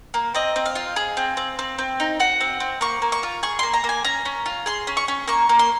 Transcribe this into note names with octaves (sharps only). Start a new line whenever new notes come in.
A#3
C4 D#5
C4
F5
F4
G#4
C4
C4
C4
C4
D#4
F#4 F#5
C4
C4
A#3 C#6
A#3
C#6
F4
G#4 C#6
A#3 C6
A#5
A#3
G#5
C#4 A#5
C#4
F4
G#4 C6
C#4
C#6
C#4
A#3 C#6
A#3
C6